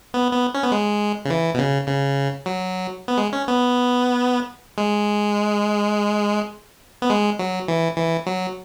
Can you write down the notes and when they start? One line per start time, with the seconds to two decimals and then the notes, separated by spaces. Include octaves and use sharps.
0.14 B3
0.32 B3
0.54 C#4
0.63 B3
0.72 G#3
1.25 C#3
1.30 E3
1.54 B2
1.58 C#3
1.88 C#3
2.46 F#3
3.08 B3
3.18 G#3
3.33 C#4
3.48 B3
4.78 G#3
7.02 B3
7.10 G#3
7.39 F#3
7.68 E3
7.97 E3
8.27 F#3